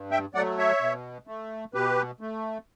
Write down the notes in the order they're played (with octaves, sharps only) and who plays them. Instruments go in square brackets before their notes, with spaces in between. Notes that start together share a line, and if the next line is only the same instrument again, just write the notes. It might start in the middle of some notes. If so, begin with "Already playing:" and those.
Already playing: [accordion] G2
E5 G5
F#3 A3 D5 F#5
C#5 E5
B2
A3
B2 G4 B4
A3